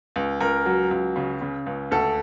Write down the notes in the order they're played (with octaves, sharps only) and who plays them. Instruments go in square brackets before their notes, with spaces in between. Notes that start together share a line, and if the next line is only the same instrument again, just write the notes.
[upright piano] C#2
C#2 A#4
F#3
C#2
C#3
C#3
C#2
D2 A4